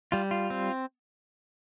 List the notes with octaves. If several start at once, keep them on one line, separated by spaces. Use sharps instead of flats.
G3 F4
F4
C4